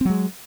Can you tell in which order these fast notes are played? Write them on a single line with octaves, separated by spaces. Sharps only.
C4 F#3 G#3